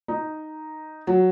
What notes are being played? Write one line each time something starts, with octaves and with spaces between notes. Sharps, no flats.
D#4
F#3